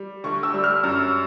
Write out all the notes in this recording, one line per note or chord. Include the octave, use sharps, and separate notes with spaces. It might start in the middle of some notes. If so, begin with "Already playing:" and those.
Already playing: G3
D2 C#6
E6
G3
F6
F#2 E6